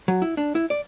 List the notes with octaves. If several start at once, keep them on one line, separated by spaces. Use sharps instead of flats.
F#3
E4
D4
E4
D5